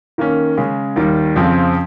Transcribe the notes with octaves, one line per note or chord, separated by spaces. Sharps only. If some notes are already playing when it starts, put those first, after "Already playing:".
D#3 A#3 C#4
C#3 G#3 C#4
D#2 D#3 G3
F2 C#3 F3 C4